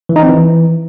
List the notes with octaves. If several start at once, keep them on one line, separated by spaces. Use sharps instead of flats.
E3
D#4
C4
E3